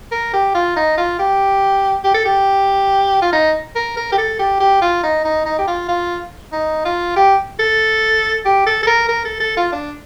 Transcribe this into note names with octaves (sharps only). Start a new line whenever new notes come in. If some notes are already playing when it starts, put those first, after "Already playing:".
A#4
G4
F4
D#4
F4
G4
G4
A4
G4
F4
D#4
A#4
A#4
G4
A4
G4
G4
F4
D#4
D#4
D#4
G4
F4
F4
D#4
F4
G4
A4
G4
A4
A4
A#4
A#4
A4
A4
F4
D4